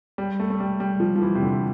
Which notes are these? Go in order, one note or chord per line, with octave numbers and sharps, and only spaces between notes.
G3
A3
A3
G3
G3
F3
F3
E3
C3
D3